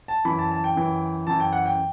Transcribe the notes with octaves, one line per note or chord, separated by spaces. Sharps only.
A5
F#2 E3 B5
A5
A5
G5
F#2 E3
F#2 E3 A5
G5
F#5
G5